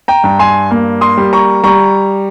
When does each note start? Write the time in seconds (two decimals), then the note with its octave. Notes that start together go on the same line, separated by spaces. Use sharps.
0.08 G5 A#5
0.24 G2
0.39 G#5 C6
0.71 A#3
1.01 C6 D#6
1.17 G3
1.33 A#5 C#6
1.63 G3 A#5 C#6